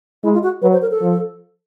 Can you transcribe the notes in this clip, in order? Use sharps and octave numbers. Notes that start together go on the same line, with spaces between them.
G#3 E4
F4
F#4
F#3 B4
C5
A#4
A4
F3